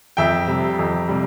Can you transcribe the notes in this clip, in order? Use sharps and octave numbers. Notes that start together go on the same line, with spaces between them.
F2 E5 G5
C3 G3
F2
C3 G3